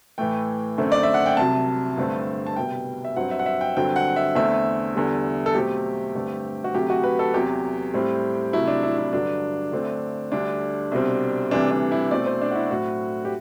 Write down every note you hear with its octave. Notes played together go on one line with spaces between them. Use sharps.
A2 E3 A3 G5
F#2 D3 A3 C4
D5
E5
F#5
G5
C2 C3 F#3 A5
G2 D3 A3 C4
A5
C2 B2 G3 B3 G5
E5
G2 F#3 C4 F#5
E5
F#5
E5
G5
G2 D3 F#3 C4 G5
F#5
E5
E2 D3 A3 C4 E5
E2 D3 G3
A4
B2 F#3 A3 C4 G4
G2 D3 A3 C4
F#4
D2 C3 F#3 A3 G4
F#4
B4
A4
E2 C3 F#3 G4
A2 G3 C4
C2 C3 F#3 A3 E4
D4
E4
E4
G2 D3 F#3 D4
D2 D3 A3 C4
D2 D3 G3 D4
C2 B2 G3 C4
D2 C3 E3 G3 D4
D4
E4
B2 A3 C4 D5
C5
D4
F#4
E4
A2 F#3 C4 F#4
G4